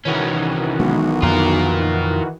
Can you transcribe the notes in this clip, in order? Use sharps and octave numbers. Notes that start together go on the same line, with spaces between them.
C2 D#3 E3 C#4 F#4
B1 G#3
F2 D3 F4 A#4